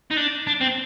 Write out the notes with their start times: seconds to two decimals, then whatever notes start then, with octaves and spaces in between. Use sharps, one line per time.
0.11 D#4
0.17 D4
0.47 D4
0.61 C4